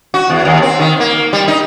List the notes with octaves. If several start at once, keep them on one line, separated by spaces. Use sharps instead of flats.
F#4
E2
D#2
C4
D#3
A#3
G3
D#4